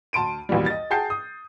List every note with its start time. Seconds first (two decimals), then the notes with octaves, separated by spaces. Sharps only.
0.13 D2 A5 C6 D7 D#7
0.49 A#1 D#2 B2 E3 G3
0.66 D#5 A6
0.90 F#4 G#4 G5 A5 G6 C7
1.10 D#6